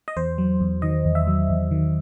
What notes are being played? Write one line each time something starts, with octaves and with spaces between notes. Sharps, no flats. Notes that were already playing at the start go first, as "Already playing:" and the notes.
D#5
E2 C5
F#3
E2
D#3 D#5
E2
E5
F#3
E2
D#3